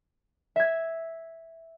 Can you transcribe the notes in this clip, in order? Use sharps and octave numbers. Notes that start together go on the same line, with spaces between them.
E5 G#6